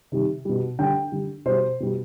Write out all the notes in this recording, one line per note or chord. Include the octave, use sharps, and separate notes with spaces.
C3 D#3 G3
B2 G3
D3 G3 G5
D3 G3
B2 G3 C5
B2 G3